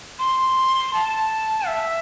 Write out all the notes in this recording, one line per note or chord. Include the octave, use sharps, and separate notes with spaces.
C6
A5
E5